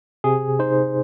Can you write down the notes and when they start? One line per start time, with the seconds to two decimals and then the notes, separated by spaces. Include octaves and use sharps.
0.24 C3 G#4
0.59 D#4 C5